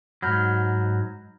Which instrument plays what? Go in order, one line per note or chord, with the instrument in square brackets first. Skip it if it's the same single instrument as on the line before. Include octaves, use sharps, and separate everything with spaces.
[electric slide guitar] G#2 F#3 [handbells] B5 F6 G6